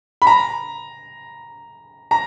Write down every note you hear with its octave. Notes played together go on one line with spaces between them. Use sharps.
B5
A#5
A#5